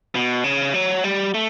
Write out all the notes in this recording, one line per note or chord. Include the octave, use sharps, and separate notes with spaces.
B2
C#3
F#3
G3
A3